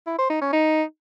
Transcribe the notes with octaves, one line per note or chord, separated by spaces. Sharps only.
E4
C5
D#4
C#4
D#4